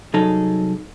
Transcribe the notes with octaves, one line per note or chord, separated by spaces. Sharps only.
C2 F#3 D#4 G#4 A4